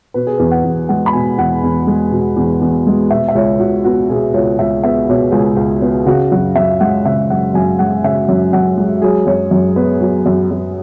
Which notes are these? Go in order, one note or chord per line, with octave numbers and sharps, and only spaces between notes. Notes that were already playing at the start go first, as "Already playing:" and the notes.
B2 B4
G#4
E2 B4
F#5
E2
G#3 F#5
B5
B2 G#5
E2 F#5
E2
G#3
B2
E2
E2
G#3
B2 E5
E5
C#2 C#5
C#2 F#4
B3 F#4
B2 G#4
C#2 C#5
C#2 E5
B3 E5
B2 C#5
C#2 G#4
C#2
B3
C#3 F#4
F#2 F#4
F#2 E5
G#3 F#5
C#3 E5
F#2 F#5
F#2 G#5
G#3 F#5
C#3 E5
F#2
F#2 F#5
G#3 F#4
F#3 G#4
F#2 C#5
F#2
B3 B4
F#3
F#2
F#2